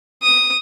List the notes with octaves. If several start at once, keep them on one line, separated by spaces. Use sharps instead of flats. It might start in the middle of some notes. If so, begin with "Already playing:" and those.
D#6